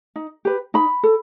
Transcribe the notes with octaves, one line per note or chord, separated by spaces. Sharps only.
D#4
G4 B4
D#4 B5
A4